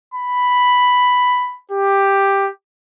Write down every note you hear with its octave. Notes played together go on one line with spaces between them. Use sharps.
B5
G4